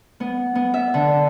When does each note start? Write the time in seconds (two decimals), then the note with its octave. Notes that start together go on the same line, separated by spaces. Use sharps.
0.20 B3
0.55 B3
0.74 E5
0.94 D3